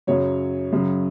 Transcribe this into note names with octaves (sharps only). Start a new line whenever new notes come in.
F#2 C#3 F#3 C#5
F#2 C#3 F#3